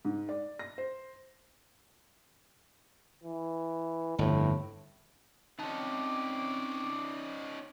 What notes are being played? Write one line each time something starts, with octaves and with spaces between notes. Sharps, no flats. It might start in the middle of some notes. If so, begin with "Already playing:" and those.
G#2
D5
A#6
C5
E3
G1 F2 A2
C4 C#4 D#4 A5 D6